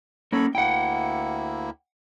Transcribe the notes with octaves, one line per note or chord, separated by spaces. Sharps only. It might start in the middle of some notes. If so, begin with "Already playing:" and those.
A#3 C#4 A4 C#5 B5
D2 A#3 E4 F#5 G5